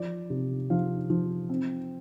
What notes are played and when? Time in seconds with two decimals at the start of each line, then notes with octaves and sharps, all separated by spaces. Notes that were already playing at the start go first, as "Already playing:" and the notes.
Already playing: F3 D5
0.30 C3
0.70 F3 F5
1.10 F3
1.49 C4